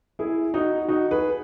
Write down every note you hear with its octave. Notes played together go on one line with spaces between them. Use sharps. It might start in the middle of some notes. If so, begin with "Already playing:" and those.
E4 G#4
D#4 F#4
D#4 F#4
G#4 B4